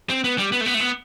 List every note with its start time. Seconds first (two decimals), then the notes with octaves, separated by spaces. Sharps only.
0.10 C4
0.24 B3
0.38 G3
0.52 B3
0.61 A3
0.66 B3
0.74 A3
0.80 B3